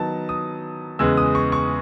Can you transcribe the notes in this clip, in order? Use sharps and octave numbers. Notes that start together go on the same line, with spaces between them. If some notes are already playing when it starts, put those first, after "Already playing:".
Already playing: D#3 F#3 B3 D#4 A5
D#6
E2 C#3 G#3 B3 E6
D#6
C#6
C#6